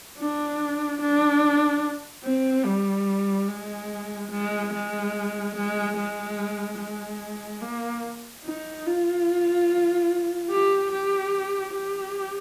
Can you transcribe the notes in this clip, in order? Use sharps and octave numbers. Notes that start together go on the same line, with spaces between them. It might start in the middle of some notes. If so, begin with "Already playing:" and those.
D4
D4
C4
G3
G#3
G#3
G#3
G#3
G#3
G#3
A#3
D#4
F4
G4
G4
G4